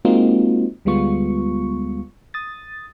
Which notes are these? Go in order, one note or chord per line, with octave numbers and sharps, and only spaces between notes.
G#3 A#3 C4 D#4 F4 F#4
D2 G3 G#3 B3 F4 C#6
D#6 A6